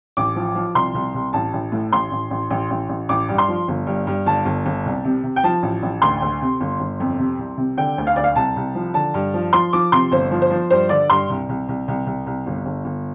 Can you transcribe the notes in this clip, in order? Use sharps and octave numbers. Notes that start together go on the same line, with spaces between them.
A1 D6
F3
F3
C2 C6
C2
C2
A1 A5
A1
A2
A1 C6
A1
A1
A1
A1
A1
A1 D6
G2
C6
F3
G1
G2
G2
G1 A5
G1
G1
C2
C3
C3
G5
F3 A5
A1
A1
D2 C6
D2
C3
G1
G1
F2
C3
C2
C3
D3 G5
D2
F5
D2 D5
F5
C2 A5
C2
F3
D3 A5
G2
F3
F3 C6
F3 D6
C3 C6
G1 C5
F3
C5
F3
G2 C5
D3 D5
G2 C6
C2
C2
C2
C2
C2
C2
G1
G1
G1